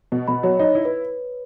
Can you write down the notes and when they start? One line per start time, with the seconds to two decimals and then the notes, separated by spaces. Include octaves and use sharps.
0.12 B2
0.28 B2 B5
0.43 F#3 C#5
0.59 D#4 C#5
0.75 E4
0.85 B4